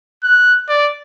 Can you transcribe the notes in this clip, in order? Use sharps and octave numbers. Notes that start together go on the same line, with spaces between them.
F#6
D5